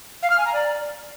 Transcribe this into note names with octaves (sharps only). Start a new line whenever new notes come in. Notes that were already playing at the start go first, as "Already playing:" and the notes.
F5
F6
G#5
A#5
D5